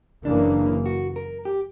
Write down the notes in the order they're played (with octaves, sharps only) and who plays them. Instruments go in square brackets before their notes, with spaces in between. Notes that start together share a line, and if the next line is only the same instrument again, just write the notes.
[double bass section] F#1 F#2 C#3 E3 A#3 [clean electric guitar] D4
[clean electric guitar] F#4
A#4
G4